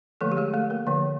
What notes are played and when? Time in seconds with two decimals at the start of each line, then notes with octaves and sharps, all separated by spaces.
0.21 D3 F3 A3 A#3 A4
0.32 G4
0.37 G#3 G#4
0.54 A3 A4
0.70 A#3 A#4
0.87 D3 F3 A#3